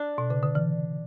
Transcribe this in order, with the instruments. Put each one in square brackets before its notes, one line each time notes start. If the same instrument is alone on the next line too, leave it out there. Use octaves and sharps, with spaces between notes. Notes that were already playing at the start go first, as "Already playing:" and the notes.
Already playing: [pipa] D4
[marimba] B2
C#3
D3
E3